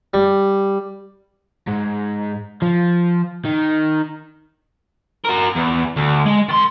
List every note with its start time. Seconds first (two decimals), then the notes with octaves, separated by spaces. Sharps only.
0.14 G3
1.67 G#2
2.62 F3
3.45 D#3
5.24 F#4 A#4
5.55 E2
5.96 D2
6.26 G#3
6.48 D#3 C6